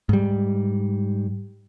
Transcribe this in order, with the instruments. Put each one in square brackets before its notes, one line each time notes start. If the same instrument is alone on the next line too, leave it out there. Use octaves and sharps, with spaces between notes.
[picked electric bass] G#2 G3